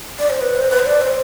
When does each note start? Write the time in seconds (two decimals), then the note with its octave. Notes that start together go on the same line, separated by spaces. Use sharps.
0.19 D5
0.30 C5
0.41 B4
0.56 C5
0.71 B4
0.79 C5
0.86 D5
1.01 C5